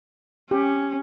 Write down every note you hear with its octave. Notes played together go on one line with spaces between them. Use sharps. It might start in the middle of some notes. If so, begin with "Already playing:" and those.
C#4 G4